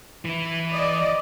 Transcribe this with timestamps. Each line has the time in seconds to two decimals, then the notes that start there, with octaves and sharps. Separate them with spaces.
0.25 E3 E4
0.73 D5 D#5